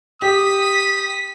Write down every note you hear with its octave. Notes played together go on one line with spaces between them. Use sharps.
G4 D#6 B6